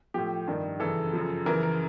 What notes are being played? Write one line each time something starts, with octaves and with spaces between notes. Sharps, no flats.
A2 F3 G4
G2 D#3
F#2 C#3 E3 A4
F#2 C#3 F3
F#2 C#3 E3 A#4
A#4